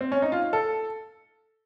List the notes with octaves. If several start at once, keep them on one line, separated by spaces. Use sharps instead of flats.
C4
C#4
D#4
F4
A4